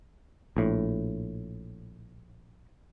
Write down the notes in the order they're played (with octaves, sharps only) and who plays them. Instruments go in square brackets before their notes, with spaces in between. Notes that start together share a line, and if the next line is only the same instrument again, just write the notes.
[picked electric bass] A#1 A2